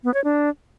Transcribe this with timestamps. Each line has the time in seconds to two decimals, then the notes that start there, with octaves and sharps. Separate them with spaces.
0.04 B3
0.14 C#5
0.24 D4